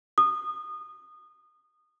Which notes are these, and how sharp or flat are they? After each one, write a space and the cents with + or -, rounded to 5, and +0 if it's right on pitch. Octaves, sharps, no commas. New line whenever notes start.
D#6 -20